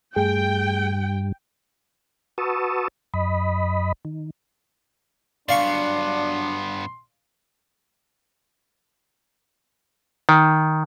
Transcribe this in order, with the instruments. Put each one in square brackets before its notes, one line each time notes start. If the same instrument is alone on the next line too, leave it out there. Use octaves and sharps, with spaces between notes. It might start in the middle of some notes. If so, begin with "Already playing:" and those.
[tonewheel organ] G2 [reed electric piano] A3 G#4 [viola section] G5
[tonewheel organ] F#4 B4 A5 C#6 D#6 E6
F#2 D#5 B5
D#3
[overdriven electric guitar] G2 B3 [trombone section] F#3 D4 [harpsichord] D5 F5 C#6 [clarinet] C6
[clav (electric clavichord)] D#3